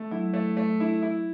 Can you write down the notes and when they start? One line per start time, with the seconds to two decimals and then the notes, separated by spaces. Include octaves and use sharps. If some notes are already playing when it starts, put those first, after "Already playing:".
Already playing: A3
0.11 F#3 E4
0.33 A3
0.57 A3
0.80 E4
1.03 E4